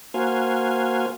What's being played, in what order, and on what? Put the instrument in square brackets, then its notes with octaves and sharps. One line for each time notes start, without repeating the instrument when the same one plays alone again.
[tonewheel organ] A#3 F#4 C5 F5 G#5